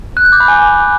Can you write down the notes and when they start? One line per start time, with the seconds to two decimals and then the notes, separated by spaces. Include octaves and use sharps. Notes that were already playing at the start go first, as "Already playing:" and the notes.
0.17 F#6
0.25 G6
0.32 D6
0.40 B5
0.48 G#5